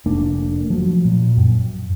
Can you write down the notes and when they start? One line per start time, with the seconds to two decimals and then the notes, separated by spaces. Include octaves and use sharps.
0.06 F1 A3 A#3 D4
0.70 F3 F#3
1.05 A#2
1.37 F#2